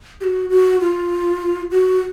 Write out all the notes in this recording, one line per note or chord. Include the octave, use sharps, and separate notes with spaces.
G4
F#4
F#4
F4
F#4